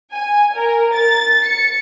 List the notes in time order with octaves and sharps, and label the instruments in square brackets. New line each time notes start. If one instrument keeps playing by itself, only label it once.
[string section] G#5
A#4
A6
C#7